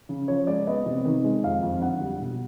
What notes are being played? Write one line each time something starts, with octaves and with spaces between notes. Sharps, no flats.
C#3
F3 C#5
G#3 D5
B3 D#5
C3
D#3
G#3
F2 F5
F2
D3 F#5
G3
B2